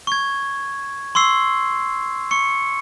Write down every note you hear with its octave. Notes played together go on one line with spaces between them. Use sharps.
C#6 G#6
C6 C#6 E6 C7
C#6 C#7